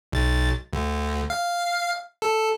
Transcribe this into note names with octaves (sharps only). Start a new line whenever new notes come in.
B1 A6
D2
F5
A4